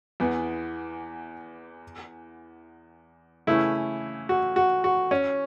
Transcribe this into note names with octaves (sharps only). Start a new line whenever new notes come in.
E2 E3 B3
C#3 E3 A3 C#4 E4
F#4
F#4
F#4
C#4